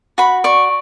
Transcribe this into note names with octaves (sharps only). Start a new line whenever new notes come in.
F#4 B5
D5 C#6